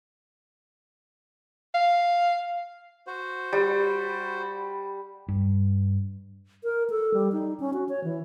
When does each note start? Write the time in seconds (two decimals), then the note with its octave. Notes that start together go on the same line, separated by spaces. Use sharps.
1.74 F5
3.07 F#4 C5
3.53 G3
5.28 G2
6.64 A#4
6.90 A4
7.14 G3
7.32 D#4
7.60 C#4
7.73 F#4
7.89 C#5
8.04 E3